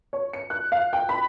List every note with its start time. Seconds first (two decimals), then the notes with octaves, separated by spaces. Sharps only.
0.13 C#5
0.33 C#7
0.50 F#6
0.72 F5
0.93 G5
1.09 B5